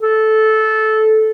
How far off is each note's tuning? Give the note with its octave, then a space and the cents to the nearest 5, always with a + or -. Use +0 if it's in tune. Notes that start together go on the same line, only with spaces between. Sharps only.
A4 -15